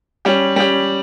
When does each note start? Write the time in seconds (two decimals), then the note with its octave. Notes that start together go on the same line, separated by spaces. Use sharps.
0.25 G3 C#4 G4
0.56 G3 C#4 G4